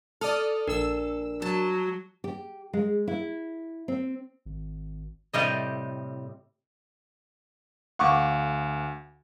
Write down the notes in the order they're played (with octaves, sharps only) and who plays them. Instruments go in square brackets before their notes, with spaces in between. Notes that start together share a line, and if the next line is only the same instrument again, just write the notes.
[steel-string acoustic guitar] A4 [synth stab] D5 D#6 F6
[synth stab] A#1 E6 [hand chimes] D4 A#4
[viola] F#3 [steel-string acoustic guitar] A5
[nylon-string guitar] G4
G#3
E4
C4
[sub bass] G#1
[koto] A2 C3 G3 D#5
[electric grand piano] D2 F5 [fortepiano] F#5 C#6 D6